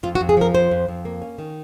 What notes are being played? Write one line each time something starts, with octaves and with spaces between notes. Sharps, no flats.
F2 F4
F#4
F2
G#4
F3 A#4
F2 C5
F2
F2
A#3
C#4
D#3